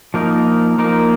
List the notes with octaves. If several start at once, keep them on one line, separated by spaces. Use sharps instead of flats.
F3 A#3 D#4 A#4
F3 A#3 D#4 A#4